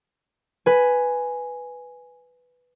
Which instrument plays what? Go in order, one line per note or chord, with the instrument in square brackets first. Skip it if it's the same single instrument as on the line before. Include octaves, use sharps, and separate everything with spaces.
[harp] B4 G#5